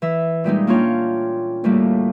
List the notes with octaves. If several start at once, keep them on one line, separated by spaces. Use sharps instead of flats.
E3 E5 E6
A#2 G3 G#3 D#4
A#3 C#4 D4 F4 C#5 G5
D2 A2 G3 A#3